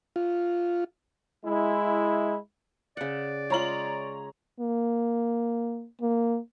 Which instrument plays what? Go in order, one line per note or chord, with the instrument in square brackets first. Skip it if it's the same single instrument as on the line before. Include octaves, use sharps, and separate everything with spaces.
[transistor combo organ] F4
[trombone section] G#3 E4
[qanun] C#3 F#5 [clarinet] D5
[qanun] G#3 F4 [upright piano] C#5 A#5 F#7
[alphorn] A#3
A#3